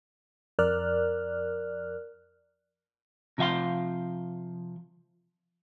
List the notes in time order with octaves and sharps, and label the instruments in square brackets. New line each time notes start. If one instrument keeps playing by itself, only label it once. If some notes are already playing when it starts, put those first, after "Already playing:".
[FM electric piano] F2 A#4 D5 F6 F#6
[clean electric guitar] C3 F3 E5 F5 C6